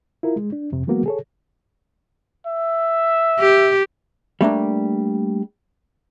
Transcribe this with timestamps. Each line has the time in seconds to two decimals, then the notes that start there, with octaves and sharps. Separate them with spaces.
0.23 E4 F4 A#4
0.36 G#3
0.52 D4
0.72 F2 C3
0.87 E3 F#3 G#3 A#3 B3 F#4
1.06 G#4 A4 C#5
2.47 E5
3.40 G4
4.41 G3 A3 A#3 D4